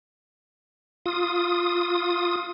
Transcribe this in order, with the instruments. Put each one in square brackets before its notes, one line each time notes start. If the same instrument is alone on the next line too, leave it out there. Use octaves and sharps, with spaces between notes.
[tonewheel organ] F4 D#6